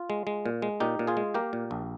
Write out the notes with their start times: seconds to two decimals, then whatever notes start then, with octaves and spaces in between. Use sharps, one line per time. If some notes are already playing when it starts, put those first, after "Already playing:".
Already playing: F4
0.10 G#3
0.27 G#3
0.46 A#2
0.62 G#3
0.80 A#2 D#4 G4
0.99 A#2
1.07 F4 G#4
1.17 G#3
1.34 A#3 G4 A#4
1.53 A#2
1.71 A#1